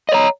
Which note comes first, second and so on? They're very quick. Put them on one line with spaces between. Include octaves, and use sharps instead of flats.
D#5 C#5 A#5